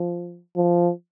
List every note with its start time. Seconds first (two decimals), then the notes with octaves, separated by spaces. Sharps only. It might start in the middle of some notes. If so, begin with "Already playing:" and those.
Already playing: F3
0.57 F3